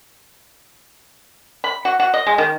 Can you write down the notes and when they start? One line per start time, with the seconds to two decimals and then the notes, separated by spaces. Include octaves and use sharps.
1.64 B5
1.85 F#4
2.00 F#4
2.14 D#5
2.27 G#3
2.38 D#3